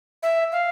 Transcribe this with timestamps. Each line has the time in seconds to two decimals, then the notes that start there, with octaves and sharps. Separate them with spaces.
0.23 E5
0.52 F5